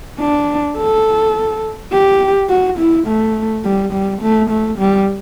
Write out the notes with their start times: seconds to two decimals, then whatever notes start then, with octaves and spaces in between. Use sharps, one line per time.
0.20 D4
0.77 A4
1.92 G4
2.50 F#4
2.79 E4
3.07 A3
3.64 G3
3.93 G3
4.22 A3
4.50 A3
4.78 G3